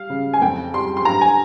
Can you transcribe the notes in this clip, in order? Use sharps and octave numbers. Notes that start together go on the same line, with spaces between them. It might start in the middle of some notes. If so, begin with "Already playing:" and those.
Already playing: G3 F5
C#3
G#5
F2 G5
G3 C6
C6
G2 A#5
G#5